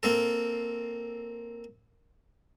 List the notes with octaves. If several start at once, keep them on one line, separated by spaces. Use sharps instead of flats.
A#3 C4 A4